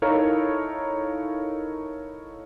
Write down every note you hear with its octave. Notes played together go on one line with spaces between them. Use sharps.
D#4 E4 A4 A#4 C#5 F5